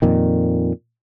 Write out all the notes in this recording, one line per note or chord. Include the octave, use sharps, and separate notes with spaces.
F2 A#2 D#3